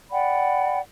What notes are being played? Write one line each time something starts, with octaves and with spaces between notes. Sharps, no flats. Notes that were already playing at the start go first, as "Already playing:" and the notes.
D5 F#5 G5 B5